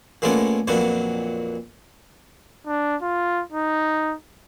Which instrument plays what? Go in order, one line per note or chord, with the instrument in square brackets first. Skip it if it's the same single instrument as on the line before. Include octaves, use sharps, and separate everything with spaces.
[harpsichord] A#2 G#3 A3 B3 C#4 D5
F2 A#2 F#3 B3 D4
[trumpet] D4
F4
D#4